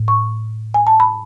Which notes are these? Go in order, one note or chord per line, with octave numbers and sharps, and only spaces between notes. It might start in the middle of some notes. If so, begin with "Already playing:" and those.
Already playing: A2
C#6
G#5
A5
B5